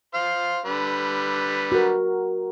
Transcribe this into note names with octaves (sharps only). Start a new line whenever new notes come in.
C5 F5
D3 G3 B4
F#4 A#4